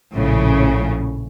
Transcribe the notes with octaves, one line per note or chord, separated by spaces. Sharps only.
A#1 A2 C#3